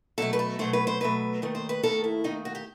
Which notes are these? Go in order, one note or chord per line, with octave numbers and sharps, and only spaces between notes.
B2 F#3 A3 A4
B4
A4
B2 F#3 A3 C5
B4
C5
B2 F#3 A3 B4
D#2 D#3 A3
C5
B4
D#2 D#3 A3 A4
E4
D#2 D#3 A3 D#4
F#4
G4